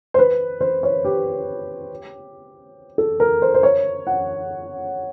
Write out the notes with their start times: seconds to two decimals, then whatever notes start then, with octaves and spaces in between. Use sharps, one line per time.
0.14 C5
0.19 B4
0.61 C5
0.83 C#5
1.05 G4
2.98 A4
3.20 A#4
3.42 C5
3.54 C5
3.63 C#5
4.07 F#5